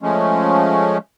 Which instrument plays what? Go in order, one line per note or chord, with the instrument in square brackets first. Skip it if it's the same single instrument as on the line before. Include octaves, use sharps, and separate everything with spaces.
[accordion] F3 G#3 A3 C#4